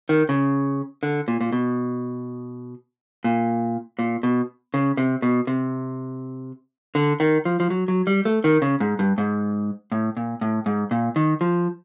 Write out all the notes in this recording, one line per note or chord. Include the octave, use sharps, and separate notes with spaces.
D#3
C#3
D3
A#2
A#2
B2
A#2
A#2
B2
C#3
C3
B2
C3
D3
D#3
F3
F3
F#3
F#3
G3
A3
D#3
C#3
G#2
G2
G#2
A2
A#2
A2
G#2
A#2
D#3
F3